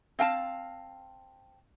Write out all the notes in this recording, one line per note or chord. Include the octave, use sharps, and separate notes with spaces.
C4 F5 G5 A5